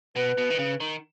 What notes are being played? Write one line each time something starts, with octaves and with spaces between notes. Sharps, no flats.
B2 B4
B2
D#3
C#3
D#3